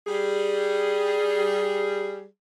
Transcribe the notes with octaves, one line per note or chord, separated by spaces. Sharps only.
G3 G#4